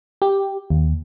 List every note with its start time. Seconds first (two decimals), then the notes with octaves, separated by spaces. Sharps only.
0.22 G4
0.70 D#2